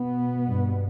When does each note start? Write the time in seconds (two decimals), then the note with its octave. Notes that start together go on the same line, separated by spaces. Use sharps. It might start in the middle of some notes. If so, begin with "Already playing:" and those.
Already playing: B2 B3
0.49 G2